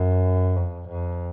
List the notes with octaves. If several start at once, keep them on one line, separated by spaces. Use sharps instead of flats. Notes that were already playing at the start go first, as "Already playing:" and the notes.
Already playing: F#2
F2
F2